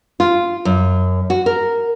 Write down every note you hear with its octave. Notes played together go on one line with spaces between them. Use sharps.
F4
F#2
F#4
A#4